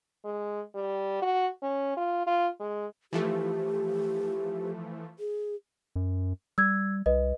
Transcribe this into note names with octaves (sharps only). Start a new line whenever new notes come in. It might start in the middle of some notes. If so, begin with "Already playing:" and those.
G#3
G3
F#4
C#4
F4
F4
G#3
E3 F3 A3 G4
G#4
F#2
G3 E6 G#6
C2 B4 D#5